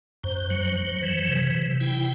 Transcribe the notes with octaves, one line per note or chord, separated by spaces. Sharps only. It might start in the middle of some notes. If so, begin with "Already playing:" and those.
F#2 C5
F#3
F#3
E3
C3
C3
E4 G5